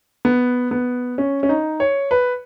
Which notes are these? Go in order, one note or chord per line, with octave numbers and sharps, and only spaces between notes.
B3
B3
C#4
C#4
D#4
C#5
B4